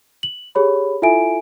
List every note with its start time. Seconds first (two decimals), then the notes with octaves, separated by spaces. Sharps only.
0.23 F#7
0.55 G4 G#4 C#5 B5
1.02 E4 F4 A4 E5 G#5 D7